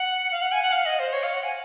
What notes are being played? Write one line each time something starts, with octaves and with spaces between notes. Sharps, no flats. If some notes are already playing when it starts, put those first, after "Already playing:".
Already playing: F#5
F5
F#5
G#5
F#5
F5
D#5
C5
C#5
F5
F#5
G#5